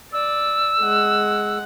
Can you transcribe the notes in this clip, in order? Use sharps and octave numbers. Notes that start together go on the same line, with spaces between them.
D5 E6
G#3 F#5